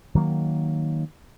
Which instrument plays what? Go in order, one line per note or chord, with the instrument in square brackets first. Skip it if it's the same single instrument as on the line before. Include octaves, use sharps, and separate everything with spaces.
[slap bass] D#3 F#3 A#3